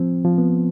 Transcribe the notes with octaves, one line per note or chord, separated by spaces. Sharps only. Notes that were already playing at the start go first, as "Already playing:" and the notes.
Already playing: F3 C4
F3
B3